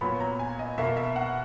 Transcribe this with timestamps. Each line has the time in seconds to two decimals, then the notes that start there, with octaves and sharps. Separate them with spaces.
0.01 A#2 F#3 B3 B5
0.20 A#5
0.39 G#5
0.59 D#5
0.78 B2 A#3 E5
0.97 E5
1.16 F#5